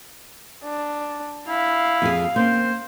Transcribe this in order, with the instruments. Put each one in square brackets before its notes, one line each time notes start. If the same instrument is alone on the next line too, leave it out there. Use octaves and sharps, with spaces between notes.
[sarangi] D4
[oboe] E4 [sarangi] F5
[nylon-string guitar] F2 C4 G#4
[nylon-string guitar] A#3 C4 C#4 [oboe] C5